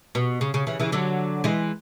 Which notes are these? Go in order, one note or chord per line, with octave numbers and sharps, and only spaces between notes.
B2
C#3
C#3
C#3 E3
C#3 E3
D3 F#3
E3 G#3